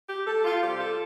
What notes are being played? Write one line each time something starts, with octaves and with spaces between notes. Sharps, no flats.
G4
A4
F4
C3 G3 C4 F4 G4
A4